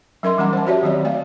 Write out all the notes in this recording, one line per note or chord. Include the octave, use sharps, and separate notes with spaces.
F#3 C#4 A#4 D#5 E5 C6
E3 G3 C#4 F#5 A#5
C5 A5
F#4 G4 C#5 D5 E5
D#3 F#3 C4 D#5
A3 D5 F5